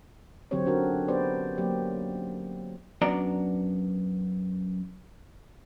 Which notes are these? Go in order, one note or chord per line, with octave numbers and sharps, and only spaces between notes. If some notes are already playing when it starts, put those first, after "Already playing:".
D3 F#3 C4 G4 C5 C#5
C#4 D4 F#4 A#4
B3 G4 B4 C5 D5
F#3 A#3 G4 D5
F#2 B3 D4 F#4 D5 A#5